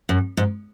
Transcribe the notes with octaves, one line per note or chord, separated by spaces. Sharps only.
F#2
G#2